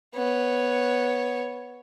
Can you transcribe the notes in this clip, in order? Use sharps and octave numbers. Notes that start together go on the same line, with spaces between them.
B3 C#5